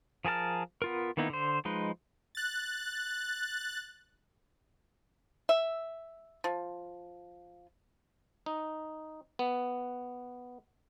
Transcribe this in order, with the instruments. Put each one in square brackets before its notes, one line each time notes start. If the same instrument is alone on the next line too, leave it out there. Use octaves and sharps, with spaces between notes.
[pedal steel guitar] F3 G#4 A#4 A5 F6
B3 F4 A#4
D#3 A#3 B3 D#4 E4
D3 C5
F3 G#3 D#4 B4
[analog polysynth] F#6 A6
[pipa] E5
F3
[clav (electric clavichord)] D#4
B3